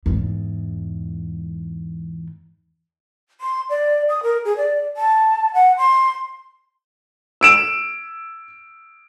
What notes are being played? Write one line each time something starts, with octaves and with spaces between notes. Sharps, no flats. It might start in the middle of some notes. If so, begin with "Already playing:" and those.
E2 G#2
C6
D5
D#6
A#4
G#4
D5
A5
F#5
C6
E6 D7 E7